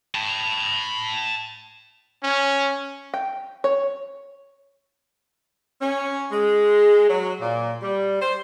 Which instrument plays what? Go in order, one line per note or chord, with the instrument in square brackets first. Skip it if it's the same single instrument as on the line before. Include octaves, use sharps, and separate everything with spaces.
[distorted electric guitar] A5 B5
[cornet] C#4
[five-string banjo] G5
C#5
[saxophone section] C#4
G#3
F#3
A#2
G3
C5